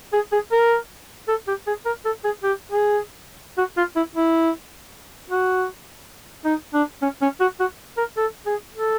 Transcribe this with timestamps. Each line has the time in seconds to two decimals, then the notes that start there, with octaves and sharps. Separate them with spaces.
0.13 G#4
0.32 G#4
0.52 A#4
1.28 A4
1.47 G4
1.67 G#4
1.85 A#4
2.05 A4
2.24 G#4
2.43 G4
2.72 G#4
3.58 F#4
3.77 F4
3.96 E4
4.16 E4
5.30 F#4
6.45 D#4
6.74 D4
7.02 C#4
7.22 C#4
7.41 F#4
7.60 F#4
7.97 A#4
8.17 A4
8.46 G#4
8.75 A4